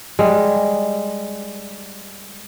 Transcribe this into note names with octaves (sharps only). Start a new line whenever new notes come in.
G3 G#3